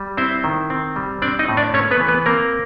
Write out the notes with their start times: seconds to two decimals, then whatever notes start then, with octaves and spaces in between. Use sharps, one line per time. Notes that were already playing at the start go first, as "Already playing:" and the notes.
Already playing: G3
0.17 C4 E4 C5
0.44 D#3
0.70 C4
0.96 G3
1.22 C4 D4 D5
1.39 D#4 D#5
1.48 A2
1.57 D4 D5
1.74 A3 C#4 C#5
1.91 B3 B4
2.00 E3
2.08 B3 B4
2.26 A#3 C4 A#4